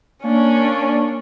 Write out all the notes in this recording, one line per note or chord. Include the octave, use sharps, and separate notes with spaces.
A#3 C#4 D4